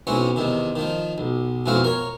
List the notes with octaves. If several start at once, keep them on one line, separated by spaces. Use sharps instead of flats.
B1 E3 C4 C#4 C#6
E2 C3 D#3
D#3 F3
B1
B1 F2 E3 C4 F5 C#6
A#4 C#5